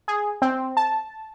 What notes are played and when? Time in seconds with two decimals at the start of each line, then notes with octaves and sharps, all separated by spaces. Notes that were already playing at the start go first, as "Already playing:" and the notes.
0.08 G#4
0.42 C4
0.77 A5